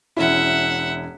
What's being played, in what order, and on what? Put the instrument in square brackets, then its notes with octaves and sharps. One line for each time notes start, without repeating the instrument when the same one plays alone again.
[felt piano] E1 C#4 E4 [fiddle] E5 F#5